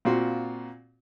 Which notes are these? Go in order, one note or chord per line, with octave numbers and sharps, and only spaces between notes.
A#2 C4 F4 F#4